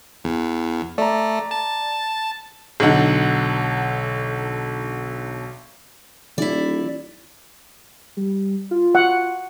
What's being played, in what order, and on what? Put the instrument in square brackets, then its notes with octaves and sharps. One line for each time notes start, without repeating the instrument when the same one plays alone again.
[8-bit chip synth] E2
[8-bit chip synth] A3 [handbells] D5 A#5
[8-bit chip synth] A5
[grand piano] B1 D3 D#4 F#5
[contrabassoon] D#1 [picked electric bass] E3 [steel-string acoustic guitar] E4 D5
[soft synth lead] G3
F4
[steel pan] F#5